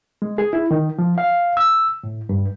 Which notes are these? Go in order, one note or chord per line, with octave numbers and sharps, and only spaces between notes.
G#3
G#4
E4
D#3
F3
F5
E6
A2
G2